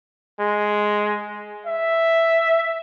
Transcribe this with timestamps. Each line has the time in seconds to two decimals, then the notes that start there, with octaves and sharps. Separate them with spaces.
0.40 G#3
1.67 E5